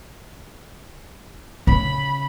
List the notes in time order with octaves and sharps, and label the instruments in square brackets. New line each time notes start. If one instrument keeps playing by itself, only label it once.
[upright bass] C#3 [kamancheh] B5